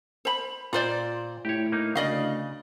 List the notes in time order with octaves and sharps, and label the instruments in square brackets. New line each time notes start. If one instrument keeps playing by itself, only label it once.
[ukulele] C5 B5
[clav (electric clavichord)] A#2 [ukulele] F4 C5 D5
[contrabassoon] A2 [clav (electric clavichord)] G4 C#5
[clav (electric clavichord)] A#3 D#4
[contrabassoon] D2 [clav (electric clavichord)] C#3 [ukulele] D5 D#5 F5